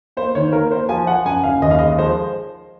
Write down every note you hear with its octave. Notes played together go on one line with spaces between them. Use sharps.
A#3 C5
D#3 C#5
A#3 A#4
A#3 C5
F3 G#5
F3 F#5
F#2 G#5
F#1 F5
D#2 D#5
F5
G#3 D#5
F3 C5